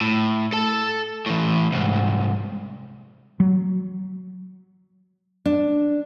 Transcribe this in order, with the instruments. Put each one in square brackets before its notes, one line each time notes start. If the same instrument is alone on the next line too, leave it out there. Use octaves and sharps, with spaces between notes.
[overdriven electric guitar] A2
A4 A5
A2 E3
C2 G#2
[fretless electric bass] F#3
[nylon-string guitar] D4